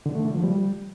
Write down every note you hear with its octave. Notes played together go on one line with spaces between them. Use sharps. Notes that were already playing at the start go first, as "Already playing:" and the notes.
D3
A3
D3
F3
G3